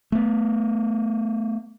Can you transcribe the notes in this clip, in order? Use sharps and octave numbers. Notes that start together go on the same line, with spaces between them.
A3 B3